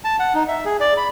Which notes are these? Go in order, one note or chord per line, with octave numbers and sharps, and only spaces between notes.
A5
F#5
D#4
E5
G#4
D5
B5